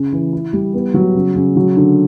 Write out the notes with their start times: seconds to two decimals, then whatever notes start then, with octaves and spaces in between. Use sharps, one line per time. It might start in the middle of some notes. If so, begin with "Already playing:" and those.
Already playing: C#3
0.12 E3
0.33 E4
0.53 G3
0.74 B3
0.94 F#3
1.15 C#3
1.35 C#3
1.56 F#3
1.76 D3